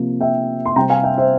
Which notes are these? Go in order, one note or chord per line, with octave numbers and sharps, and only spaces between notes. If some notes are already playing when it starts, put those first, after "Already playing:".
Already playing: C3 F3 A#3
E5 G5
C6
C3 G3 C4 G5 A#5
F5 G#5
E5 G5
C5 E5